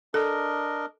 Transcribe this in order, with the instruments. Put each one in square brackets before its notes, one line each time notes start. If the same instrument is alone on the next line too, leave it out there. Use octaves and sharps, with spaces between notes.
[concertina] D4 A#4 D#5 [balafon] A4